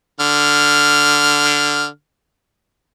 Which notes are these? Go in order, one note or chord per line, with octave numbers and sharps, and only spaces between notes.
D3 F6